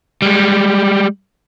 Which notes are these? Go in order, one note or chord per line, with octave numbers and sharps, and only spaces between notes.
G3 G#3